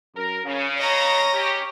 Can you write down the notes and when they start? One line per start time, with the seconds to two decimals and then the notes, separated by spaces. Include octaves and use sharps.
0.16 F#2 A#4
0.45 C#3 C#4
0.78 C#5 D#5 A#5
1.33 C#4 G4